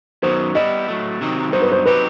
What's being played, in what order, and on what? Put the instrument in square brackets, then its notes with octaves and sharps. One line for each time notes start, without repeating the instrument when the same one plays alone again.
[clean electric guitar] F#2 D#3 F#3 B3 [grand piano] C5
[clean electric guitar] G3 B3 E4 [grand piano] D#5
[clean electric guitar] A2 F#3 A3
C3 D#3 F#3 C4 D#4
[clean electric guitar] G2 F#3 B3 D#4 [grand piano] C5
[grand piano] B4
C5
[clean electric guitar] F#3 C4 D#4 G4 [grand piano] B4